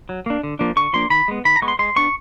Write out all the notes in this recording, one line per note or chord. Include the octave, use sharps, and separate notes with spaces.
F#3
A#3 D4
D3
F3 A#3 D4
D3 C#6
F3 A#3 D4 C6
D#3 B5
G#3 B3
D#3 B5
A#5
G#3 B3 C#6
C6
G#3 C6
B3 D4 C#6